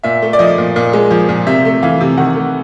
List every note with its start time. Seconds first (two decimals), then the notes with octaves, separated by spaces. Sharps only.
0.04 A#2 E5
0.22 A3
0.33 D5
0.39 F3 D#5
0.58 A#2
0.76 A#2
0.93 G#3
1.11 F3
1.29 A#2
1.47 C3 E5
1.65 A3
1.83 E3 F5
2.01 C3
2.17 D#3 F#5
2.35 A3